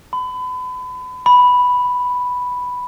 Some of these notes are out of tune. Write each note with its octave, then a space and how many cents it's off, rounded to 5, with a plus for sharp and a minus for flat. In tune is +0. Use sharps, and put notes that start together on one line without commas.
B5 +35
B5 +0